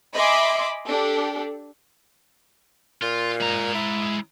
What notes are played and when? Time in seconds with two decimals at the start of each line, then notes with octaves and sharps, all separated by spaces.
0.13 D#5 E5 G#5 B5 C6 D6
0.87 D4 G4 A4
3.02 A#2 F4
3.41 G#3 A#5
3.75 E4